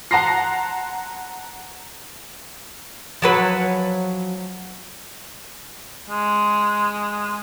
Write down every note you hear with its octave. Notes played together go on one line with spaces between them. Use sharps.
F#5 A5 A#5 C6 A#6 C7
F3 F#3 B4
G#3